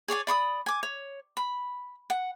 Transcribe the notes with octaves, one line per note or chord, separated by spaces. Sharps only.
G#4 C#5 D5 G#5
D5 B5 C#6 D#6
G#5 D6
C#5
B5
F#5